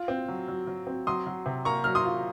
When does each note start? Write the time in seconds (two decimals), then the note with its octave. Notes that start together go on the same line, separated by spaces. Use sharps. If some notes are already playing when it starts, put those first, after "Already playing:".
Already playing: F4
0.08 C4
0.29 F#3
0.48 F#3
0.67 F#3
0.87 C4
1.07 F#3 C6 D#6
1.27 F#3
1.46 C3
1.65 A#3 A#5 C#6
1.84 F#3 F6
1.95 C6 D#6
2.05 F4